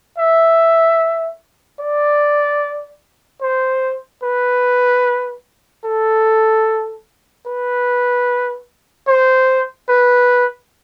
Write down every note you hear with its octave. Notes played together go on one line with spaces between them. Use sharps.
E5
D5
C5
B4
A4
B4
C5
B4